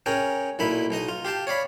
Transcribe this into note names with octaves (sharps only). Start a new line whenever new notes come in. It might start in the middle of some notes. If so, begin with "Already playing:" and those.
C#4 G#4 A#4 G5
B1 A#2 D#4 E4 B5
B1 D#4 D#5 D#6
F4
G4 F5 G5 A5
C#5 D5 F5 B5